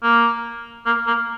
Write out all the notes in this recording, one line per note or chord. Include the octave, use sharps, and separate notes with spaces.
A#3
A#3
A#3